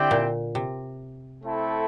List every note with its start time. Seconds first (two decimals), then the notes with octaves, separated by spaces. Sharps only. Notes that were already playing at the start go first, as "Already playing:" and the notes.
Already playing: D3 C4 E4 G4 D5 G5
0.11 A#2
0.55 C3
1.43 A3 C4 E4 A4